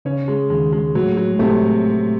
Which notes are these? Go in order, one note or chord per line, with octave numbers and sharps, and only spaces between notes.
C#3 C#4
G#3
D#2 D#3 G#3
G#3
A2 F#3 A3
F#3
G#3
A2 C3 A3